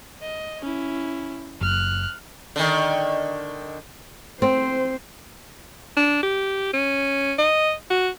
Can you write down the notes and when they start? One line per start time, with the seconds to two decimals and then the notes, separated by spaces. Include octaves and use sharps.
0.22 D#5
0.61 C#4 E4
1.61 F#1 F6 F#6
2.56 D3 D#3
4.42 C4 C5
5.96 D4
6.23 G4
6.74 C#4
7.38 D#5
7.90 F#4